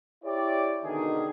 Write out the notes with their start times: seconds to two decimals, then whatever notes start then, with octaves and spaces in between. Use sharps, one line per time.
0.24 E4 G4 C#5 D5
0.84 B2 D3 D#3 G#4